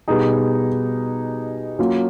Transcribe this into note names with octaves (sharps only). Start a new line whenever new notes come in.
B2 G3 B3 D#4 G#4
F#3 A#3 C#4 F4